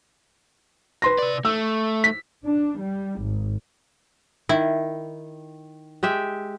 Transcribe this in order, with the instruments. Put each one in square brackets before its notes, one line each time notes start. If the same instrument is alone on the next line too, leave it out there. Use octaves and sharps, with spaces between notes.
[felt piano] B4 C6 A#6
[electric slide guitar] C3 D5
[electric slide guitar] A3 [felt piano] E6
[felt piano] B6
[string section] D4
G3
G#1
[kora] D#3 [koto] E4
[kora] G#3 G4 E5